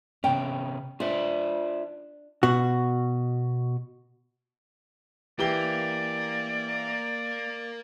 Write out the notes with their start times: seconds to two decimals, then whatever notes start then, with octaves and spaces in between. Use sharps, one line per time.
0.24 C3 B3 C#4 G5
1.00 D4 F4 C5 E5
2.43 B2 F#4
5.39 E3 A#3 G4 D5 G7